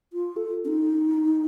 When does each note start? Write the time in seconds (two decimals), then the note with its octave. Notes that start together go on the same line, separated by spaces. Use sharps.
0.13 F4
0.36 A4
0.65 C#4
0.68 D#4